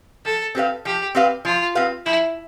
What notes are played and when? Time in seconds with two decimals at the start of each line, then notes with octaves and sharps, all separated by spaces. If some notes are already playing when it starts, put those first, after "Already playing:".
0.25 F3 A4
0.55 C4 G4 B4 F5
0.85 F3 G4
1.15 C4 G4 B4 F5
1.45 F3 F4
1.75 C4 G4 B4 F5
2.06 F3 E4